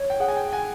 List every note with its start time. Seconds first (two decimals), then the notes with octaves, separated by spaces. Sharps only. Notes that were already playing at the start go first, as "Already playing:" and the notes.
Already playing: C#5
0.10 G5
0.20 G#4 F#5
0.28 G#5
0.37 G5
0.53 F#5 G#5